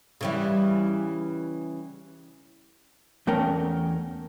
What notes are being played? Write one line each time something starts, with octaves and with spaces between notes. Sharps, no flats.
C#3 E3 G3
E2 A3 C#4 A#4 G5